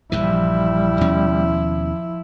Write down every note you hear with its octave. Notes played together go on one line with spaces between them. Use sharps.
A#1 G2 E3 F3 G3 E4
D#2 B2 C#4